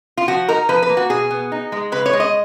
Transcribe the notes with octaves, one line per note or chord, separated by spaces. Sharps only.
F4
F3 F#4
D#4 A#4
F3 B4
B4
A#3
F#4
B2 G#4
B3
D#4
G#3
C#3 B4
C#5
G#3
D#5